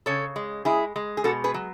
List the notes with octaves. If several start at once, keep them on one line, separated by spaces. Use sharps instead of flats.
C#3 A4 C#5
G#3
G#3 E4 G#4
G#3
G#4
B2 F#4 A4
G#4 B4
F#3